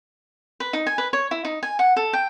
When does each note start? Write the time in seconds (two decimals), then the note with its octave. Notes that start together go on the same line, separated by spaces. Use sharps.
0.60 B4
0.73 D#4
0.87 G#5
0.98 B4
1.13 C#5
1.31 E4
1.45 D#4
1.63 G#5
1.79 F#5
1.96 A4
2.13 G5